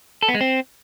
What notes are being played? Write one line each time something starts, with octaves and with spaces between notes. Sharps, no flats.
A4
B3
G#3
C4